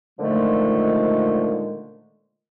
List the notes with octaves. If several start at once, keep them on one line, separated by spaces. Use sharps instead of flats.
A#2 D3 D#3 F3 G#3 A3